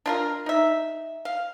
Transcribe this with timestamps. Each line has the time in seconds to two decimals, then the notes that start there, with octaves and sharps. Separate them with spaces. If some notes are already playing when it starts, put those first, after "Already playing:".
0.06 D4 F4 A#4
0.46 D#4 E5
1.25 F5